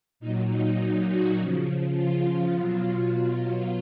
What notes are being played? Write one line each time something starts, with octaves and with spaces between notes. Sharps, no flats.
A#2 D#4
F#3
D#4
D#4
F#4
C#3 F3
F4
F4
B2 F#3